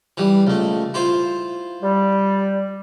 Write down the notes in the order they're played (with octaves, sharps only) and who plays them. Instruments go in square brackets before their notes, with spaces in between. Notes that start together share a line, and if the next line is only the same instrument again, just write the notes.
[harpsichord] E3 G3
C#2 A3
E4 F4 C5
[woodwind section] G3